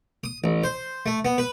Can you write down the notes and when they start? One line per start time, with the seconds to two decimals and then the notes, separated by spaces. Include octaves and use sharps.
0.24 D#6
0.44 A1
0.64 C5
1.06 A3
1.25 B3
1.38 B4